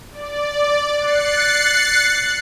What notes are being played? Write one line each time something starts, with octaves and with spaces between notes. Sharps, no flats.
D5
F#6 A6 C7 C#7